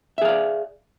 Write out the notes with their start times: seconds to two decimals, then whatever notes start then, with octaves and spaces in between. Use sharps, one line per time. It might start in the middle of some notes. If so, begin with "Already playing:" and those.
0.18 E5
0.22 G#4
0.25 F5
0.29 D5